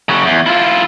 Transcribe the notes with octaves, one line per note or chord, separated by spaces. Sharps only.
C#3 F#4
E2
E4 F4